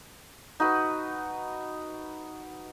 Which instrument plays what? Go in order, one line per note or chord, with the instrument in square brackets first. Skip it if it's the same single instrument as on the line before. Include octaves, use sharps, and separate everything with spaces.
[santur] D#4 F#4 B4